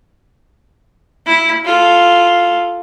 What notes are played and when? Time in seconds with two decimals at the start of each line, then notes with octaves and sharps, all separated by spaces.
1.26 E4
1.65 F4 A4